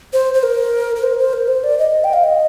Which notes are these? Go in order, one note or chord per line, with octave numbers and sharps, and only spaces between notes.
C5
C5
A#4
A#4
C5
C5
A#4
C5
D5
D#5
G5
F5
D#5